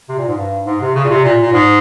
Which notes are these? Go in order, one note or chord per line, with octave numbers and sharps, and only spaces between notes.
C3
A#2
G#2
G2
G#2
C3
C#3
A#2
C3
A#2
A#2
G#2